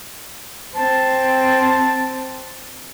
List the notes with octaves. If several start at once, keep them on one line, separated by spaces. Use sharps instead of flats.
C4 A5